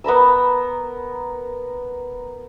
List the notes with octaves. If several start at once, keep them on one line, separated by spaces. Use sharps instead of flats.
B3 A#4 B5 E6